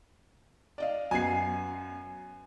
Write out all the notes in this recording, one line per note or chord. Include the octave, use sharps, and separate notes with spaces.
D5 D#5 F5
F#2 B3 G#5 C7